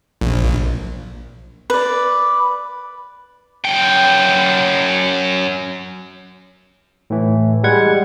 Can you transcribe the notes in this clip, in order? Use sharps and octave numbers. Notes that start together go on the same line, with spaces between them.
A#1
B4 D5
F#2 G5
A2 E3
G3 G#3 F#5 G#6